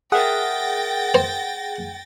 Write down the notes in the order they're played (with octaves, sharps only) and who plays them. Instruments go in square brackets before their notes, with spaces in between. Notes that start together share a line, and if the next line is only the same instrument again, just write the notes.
[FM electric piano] G#4 F#5 [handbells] A#4 E5 D#6 [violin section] G5 A6 A#6
[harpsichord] C5